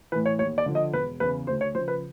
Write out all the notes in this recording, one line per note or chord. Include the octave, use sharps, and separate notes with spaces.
A2 E3 B4
C#5
D#2 C#5
D5
D3 F3
D#5
E1 B4
E2 C#3 B4
D2 C5
C#5
C#3 F3 C5
B4